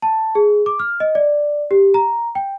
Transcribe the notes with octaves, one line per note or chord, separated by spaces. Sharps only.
A5
G#4
D6
F6
D#5
D5
G4
A#5
G5